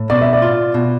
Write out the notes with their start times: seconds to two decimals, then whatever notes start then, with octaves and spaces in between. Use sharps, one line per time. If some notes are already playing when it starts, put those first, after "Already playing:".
Already playing: A2
0.10 B2 D5
0.21 E5
0.33 D5
0.42 F4
0.74 B2